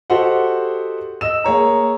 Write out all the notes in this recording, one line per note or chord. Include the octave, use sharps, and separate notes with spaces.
F#4 G4 A4 C5 D#5 F#5
D#5 E6 E7
A#3 G#4 C#5 A#5